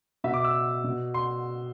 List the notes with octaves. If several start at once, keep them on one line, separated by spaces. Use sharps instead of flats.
B2 E5
D6
E6
B2
C6